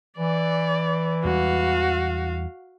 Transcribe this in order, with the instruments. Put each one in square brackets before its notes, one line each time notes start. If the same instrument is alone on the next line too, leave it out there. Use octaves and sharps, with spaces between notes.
[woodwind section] E3 [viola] D5
[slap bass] E2 G3 G#3 [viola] F#4 F5